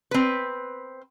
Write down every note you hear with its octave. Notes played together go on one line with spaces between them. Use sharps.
C4 B4